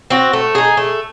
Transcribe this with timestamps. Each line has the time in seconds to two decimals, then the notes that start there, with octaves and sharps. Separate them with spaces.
0.10 C4 F#4
0.33 A3
0.55 D#4 G#4
0.77 A3